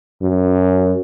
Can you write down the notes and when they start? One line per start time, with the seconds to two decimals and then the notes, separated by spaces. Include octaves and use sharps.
0.22 F#2